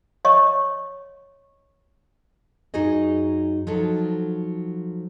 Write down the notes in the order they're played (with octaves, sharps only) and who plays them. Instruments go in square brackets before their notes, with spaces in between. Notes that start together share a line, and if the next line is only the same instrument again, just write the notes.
[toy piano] C#5 D#5 C#6
[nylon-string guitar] F#2 D#4 F#4 G#4 D#5
F3 F#3 D#4 A4